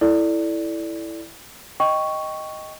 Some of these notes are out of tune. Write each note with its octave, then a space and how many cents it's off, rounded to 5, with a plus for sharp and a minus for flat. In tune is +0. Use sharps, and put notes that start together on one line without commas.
E4 +0 A4 +0 D5 +0
D#5 +0 G5 +0 C#6 +0